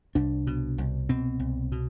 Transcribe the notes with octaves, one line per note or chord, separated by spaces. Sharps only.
C2 D4
B2
C2
B2 C4
C2
B2